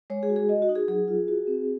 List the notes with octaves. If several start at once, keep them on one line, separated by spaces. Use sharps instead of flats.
G#3 C#5
G#4
F#4
G#4
F#4 D#5
F#4
D#4
G#4
F#3 G#4
F4
F#4
C4